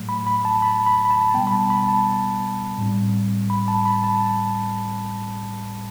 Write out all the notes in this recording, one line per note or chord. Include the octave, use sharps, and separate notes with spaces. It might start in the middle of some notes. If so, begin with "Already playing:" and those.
Already playing: A2 F#3 A3
B5
B5
A5
B5
B5
B5
A5
B2 G3 B3 G5
B5
A5
B5
A5
A2 G3 C4
B5
A5
B5
A5